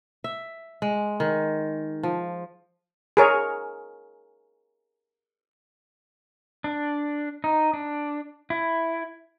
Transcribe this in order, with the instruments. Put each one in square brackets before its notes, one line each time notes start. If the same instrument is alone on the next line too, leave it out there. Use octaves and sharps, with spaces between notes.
[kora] E5
G#3
D#3
F3
[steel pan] G#4 A#4 C#5
[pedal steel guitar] D4
D#4
D4
E4